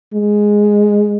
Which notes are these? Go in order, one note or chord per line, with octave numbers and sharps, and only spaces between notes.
G#3